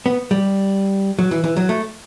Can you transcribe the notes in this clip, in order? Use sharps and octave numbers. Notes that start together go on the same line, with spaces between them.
B3
G3
F#3
E3
E3
F#3
A3